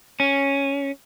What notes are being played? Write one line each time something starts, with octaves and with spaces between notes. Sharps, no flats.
C#4